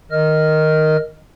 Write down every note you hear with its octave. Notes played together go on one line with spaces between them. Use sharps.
D#3 A#4 D#5 F6